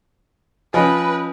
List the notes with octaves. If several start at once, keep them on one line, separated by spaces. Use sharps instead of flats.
F3 C#4 B4 C#5 D#5 G#5